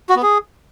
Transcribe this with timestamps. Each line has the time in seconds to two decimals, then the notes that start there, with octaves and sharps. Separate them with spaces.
0.09 F#4
0.16 B3
0.23 G#4